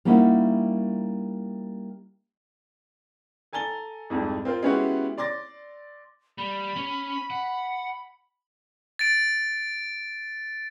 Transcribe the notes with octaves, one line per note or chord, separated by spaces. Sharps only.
G3 A#3 C#4 D#4 E4 F#4
A4 G#5 A#5 A6 G7
C2 F2 G#2
C4 F4 A#4 C5
G#3 B3 C#4 E4 F#4 G4
D5 C6 D6 A6 A#6
G3 B5
C#4 C#5
F#5
A6 D7